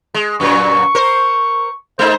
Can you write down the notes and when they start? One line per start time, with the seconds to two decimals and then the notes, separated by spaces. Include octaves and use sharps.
0.14 G#3
0.40 F#2 A#2 F#3 C#6
0.95 A#4 C5
1.99 G#3 D#4 C5